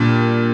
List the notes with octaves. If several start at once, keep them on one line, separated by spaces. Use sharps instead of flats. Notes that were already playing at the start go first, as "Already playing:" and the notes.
Already playing: A#2 G3 D4